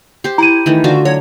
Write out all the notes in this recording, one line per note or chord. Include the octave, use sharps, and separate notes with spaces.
G4 C5
E4 A#5 D#7
D#3 E3 A3
D3 F4 F#4 D6
F#3 C#5